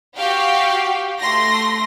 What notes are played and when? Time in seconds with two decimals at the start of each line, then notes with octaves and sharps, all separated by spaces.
0.18 F#4 G4 F5 G5
1.20 A3 C6 A#6